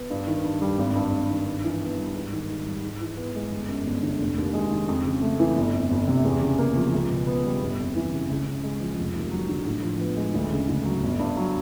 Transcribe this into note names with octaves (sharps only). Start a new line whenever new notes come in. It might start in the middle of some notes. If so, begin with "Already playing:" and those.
Already playing: B3
G2
D#3
G2
G3
G#1
G2
G#1
D#3
G2
E3
B3
G3
G#2
D#3
G#2
G3
G#2
E3
B3
G#3
G1
F#2
G1
D3
F1
D#2
G#3
D#3
F2
C#3
A3
E3
G1
F2
G1
C3
E2
C#3
A#3
F3
C#2
B2
B3
G3
G1
F2
E3
C#3
C#2
C#3
G#3
F3
F1
D#2
F#3
D3
A2
F3
B3
G#3
D2
C#3
D2
F#3
G1
G2
F#3